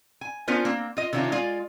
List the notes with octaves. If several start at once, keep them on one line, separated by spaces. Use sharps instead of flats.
G#5
B3 C#4 D4 F4 A#4 C5
A#3 C4
F4 D#5
C3 D#3 C#4 D4 F4
G#3 F4 D5 F5